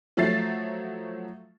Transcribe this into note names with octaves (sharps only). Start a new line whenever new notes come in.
F3 F#3 A3 E5 A6 C7